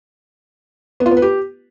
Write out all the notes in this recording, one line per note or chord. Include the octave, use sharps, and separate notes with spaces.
B3
F4
B3
B4
G4